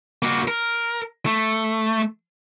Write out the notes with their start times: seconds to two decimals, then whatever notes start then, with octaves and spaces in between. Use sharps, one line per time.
0.23 A#3 F#4
0.48 A#4
1.26 A3